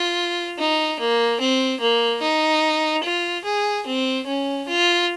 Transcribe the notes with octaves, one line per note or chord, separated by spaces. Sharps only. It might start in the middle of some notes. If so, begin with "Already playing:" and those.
Already playing: F4
D#4
A#3
C4
A#3
D#4
F4
G#4
C4
C#4
F4